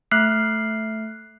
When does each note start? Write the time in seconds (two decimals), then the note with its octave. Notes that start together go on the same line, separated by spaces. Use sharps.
0.11 A3 F6 F#6 C7